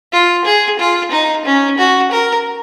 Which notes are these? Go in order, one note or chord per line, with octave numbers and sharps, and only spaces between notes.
F4
G#4
F4
D#4
C#4
F#4
A#4